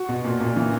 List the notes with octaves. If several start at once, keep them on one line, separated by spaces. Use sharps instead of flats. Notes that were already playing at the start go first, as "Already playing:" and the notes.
Already playing: F#4
B2
A#2
A#2
E3